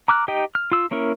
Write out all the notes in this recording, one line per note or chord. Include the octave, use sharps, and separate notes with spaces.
A#5 D6 F6 F#6
D#4 G4 D#5 G5
F6
F4 E6
A#3 C#4 E4 A#4